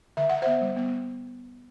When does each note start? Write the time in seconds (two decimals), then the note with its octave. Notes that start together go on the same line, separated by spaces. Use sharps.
0.17 D3 E5
0.29 D3 F#5
0.42 B3 C5 E5
0.62 G3
0.76 B3